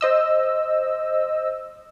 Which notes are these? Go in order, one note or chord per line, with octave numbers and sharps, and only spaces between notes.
C5 D#5 E6